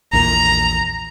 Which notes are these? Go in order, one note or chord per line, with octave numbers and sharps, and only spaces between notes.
A#1 E2 A#2 A#5